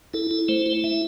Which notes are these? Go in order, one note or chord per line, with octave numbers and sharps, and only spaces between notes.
E4 A4
E4
A3 C5
E4
E5